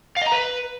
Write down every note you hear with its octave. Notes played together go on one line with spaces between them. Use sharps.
F5
D#5
A#5
B4